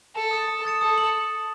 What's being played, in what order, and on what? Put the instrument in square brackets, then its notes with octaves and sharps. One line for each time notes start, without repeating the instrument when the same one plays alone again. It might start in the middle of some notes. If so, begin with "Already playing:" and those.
[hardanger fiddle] A4 [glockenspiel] A5
[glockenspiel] D#6 A6 C#7 E7
A5
D#6 A6 C#7 E7
[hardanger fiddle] A4 [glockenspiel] D#6
[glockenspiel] F#7